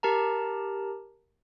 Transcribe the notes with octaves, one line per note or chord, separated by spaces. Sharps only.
G4 A#4 A5 A#5